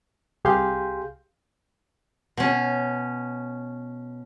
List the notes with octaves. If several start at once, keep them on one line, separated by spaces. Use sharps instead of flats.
C2 G4 G#4 F5 C6 G6
B2 C#4